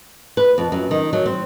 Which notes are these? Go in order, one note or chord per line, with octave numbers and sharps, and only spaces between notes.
B4
F2
F#2
D#3
F#3
C4